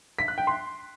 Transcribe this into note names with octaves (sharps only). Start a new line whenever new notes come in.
B6
F#6
G5
C6